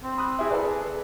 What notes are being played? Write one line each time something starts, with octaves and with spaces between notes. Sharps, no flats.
C4
B5 D#6 F#6
E4 G#4 E5
A4 B4 D5
G#4